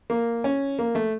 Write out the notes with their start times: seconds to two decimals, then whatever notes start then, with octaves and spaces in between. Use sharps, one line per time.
0.10 A#3
0.44 C#4
0.79 A#3
0.95 A3